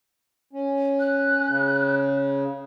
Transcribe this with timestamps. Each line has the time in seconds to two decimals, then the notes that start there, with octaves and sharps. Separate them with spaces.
0.53 C#4
1.00 F#6
1.48 C#3